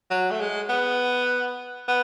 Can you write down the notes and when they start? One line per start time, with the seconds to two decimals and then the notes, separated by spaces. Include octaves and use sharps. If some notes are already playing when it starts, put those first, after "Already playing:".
0.10 F#3
0.30 A3
0.40 G#3
0.69 B3
1.87 B3